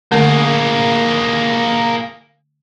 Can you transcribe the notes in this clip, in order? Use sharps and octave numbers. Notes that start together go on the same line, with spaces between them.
D3 A3 A#3 C#4 G#4